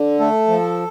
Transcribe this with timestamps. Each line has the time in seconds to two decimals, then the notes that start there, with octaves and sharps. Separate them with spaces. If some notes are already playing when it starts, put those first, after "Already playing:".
Already playing: D3
0.19 A3 A4
0.47 F3